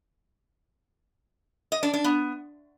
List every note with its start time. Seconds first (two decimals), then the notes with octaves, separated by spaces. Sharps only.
1.72 D#5
1.83 D4
1.94 D4
2.04 B3